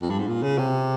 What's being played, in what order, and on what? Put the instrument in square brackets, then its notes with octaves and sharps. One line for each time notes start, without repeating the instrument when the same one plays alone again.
[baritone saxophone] F2
G2
G#2
A#2
C#3
C3